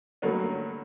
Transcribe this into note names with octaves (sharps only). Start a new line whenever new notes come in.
G2 D3 F#3 A3 A#3 C#4